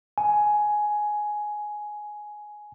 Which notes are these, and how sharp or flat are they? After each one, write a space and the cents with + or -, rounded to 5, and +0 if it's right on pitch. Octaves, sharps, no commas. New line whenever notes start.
G#5 +10